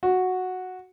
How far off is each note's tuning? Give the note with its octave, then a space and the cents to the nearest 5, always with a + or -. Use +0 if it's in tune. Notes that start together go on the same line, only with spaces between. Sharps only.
F#4 -5